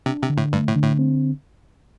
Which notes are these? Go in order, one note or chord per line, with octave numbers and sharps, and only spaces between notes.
C3 D4
C3
D3
A2
G2 A3
A2
D3
A2
C4